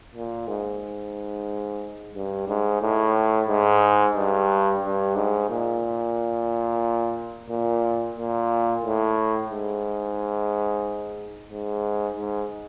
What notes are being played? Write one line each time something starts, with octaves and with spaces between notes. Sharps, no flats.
A#2
G#2
G2
G#2
A2
G#2
G2
G2
G#2
A#2
A#2
A#2
A2
G#2
G#2
G#2